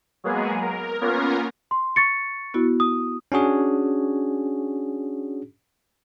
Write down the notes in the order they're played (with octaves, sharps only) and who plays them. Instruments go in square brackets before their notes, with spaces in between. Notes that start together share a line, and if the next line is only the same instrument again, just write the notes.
[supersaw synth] F#3 G#3 A#3 B3 G#4
A#4
A#3 B3 C#4 F4 A#4
[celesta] C6
C#6 A6 C#7
[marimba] B3 E4 F#4
[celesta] D#6
[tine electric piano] C#4 D4 F#4 G#4